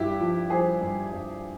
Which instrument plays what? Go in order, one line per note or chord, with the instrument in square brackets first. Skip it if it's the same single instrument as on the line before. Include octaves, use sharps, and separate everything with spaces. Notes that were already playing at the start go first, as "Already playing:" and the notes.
Already playing: [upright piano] G2 E4 G4
F3
F3 G#4 C5
G2
G2